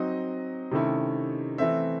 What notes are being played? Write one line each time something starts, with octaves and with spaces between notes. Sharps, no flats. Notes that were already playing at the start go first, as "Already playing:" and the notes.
Already playing: F#3 C4 D#4 D#5
C3 D#3 A3 C#4 E4
E3 A3 C4 E5